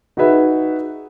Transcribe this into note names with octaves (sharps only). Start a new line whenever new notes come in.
D#4 F#4 G#4 B4 E5